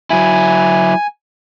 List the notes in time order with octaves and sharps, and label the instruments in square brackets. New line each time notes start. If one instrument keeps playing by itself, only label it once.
[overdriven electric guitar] F#3 E4 [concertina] G#5